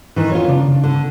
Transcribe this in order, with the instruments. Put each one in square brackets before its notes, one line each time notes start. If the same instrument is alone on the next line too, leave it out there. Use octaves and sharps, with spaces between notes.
[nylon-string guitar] D#3 E3
[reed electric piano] F2 [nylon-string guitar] F4 C#5
[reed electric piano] C#3 [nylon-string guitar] D4
[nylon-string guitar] D3